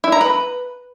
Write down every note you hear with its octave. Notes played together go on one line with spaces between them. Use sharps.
E4
A#5
B4